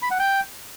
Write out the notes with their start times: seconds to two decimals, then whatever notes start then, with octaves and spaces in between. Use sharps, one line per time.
0.02 B5
0.11 F#5
0.19 G5